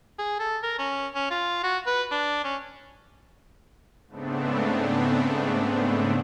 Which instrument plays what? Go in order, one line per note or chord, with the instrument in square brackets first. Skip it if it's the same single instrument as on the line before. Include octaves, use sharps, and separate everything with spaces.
[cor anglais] G#4
A4
A#4
C#4
C#4
F4
F#4
B4
D4
C#4
[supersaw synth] G#2 C#3 A3 B3 C4 D4